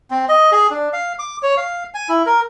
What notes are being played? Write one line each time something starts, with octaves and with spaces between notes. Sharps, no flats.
C4
D#5
G#4
D4
F5
D6
C#5
F5
G#5
E4
A#4